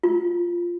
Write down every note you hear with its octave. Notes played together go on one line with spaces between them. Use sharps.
F4